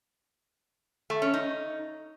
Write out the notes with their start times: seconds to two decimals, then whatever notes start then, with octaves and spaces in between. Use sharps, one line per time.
1.10 A3
1.22 C#4
1.34 D#4